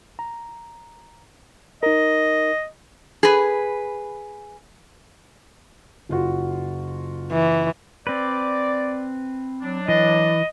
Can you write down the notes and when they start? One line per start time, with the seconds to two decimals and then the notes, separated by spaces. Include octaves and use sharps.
0.19 A#5
1.83 D#4 A#4 D#5
3.23 G#4 B4
6.09 F#1 F4 F#4
7.32 E3
8.07 C4 B4 D5
9.62 F#3 D4
9.88 E3 D#5